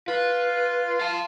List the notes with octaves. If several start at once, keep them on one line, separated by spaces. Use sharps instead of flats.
F4 B4
F5 A5